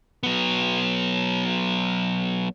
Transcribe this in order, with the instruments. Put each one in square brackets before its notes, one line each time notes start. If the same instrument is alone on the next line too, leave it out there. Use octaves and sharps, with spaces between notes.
[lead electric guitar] F#3 B3